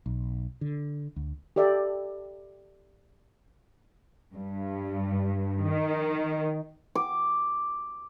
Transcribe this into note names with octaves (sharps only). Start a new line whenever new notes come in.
B1
D3
D2
G4 A4 D5 E5
G2
D#3
D6